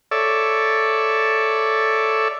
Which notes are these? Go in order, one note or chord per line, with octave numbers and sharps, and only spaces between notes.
A4 C#5 D5 E5